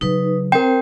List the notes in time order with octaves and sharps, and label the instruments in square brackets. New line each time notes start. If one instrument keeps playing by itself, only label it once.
[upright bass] C#3 F#3 [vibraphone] D#4 B4
[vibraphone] C4 C5 [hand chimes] A#4 G5